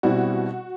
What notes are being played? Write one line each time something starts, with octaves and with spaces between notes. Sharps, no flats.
B2 G3 C4 E4 F#4